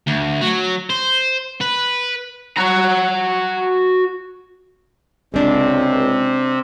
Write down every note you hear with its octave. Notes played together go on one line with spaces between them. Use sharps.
D2
F#3
C5
B4
F#4 A#5
C#2 C3 G#3 C4 D4